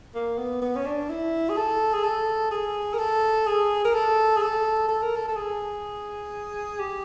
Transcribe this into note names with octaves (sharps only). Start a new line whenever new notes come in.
A#3
B3
B3
C#4
D4
E4
G#4
A4
G#4
A4
G#4
A#4
A4
G#4
A#4
A4
G#4
A4
A4
A#4
A4
A4
G#4
G4